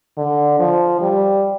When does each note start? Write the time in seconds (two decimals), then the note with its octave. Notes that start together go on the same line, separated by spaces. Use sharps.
0.18 D3
0.59 F3
1.01 G3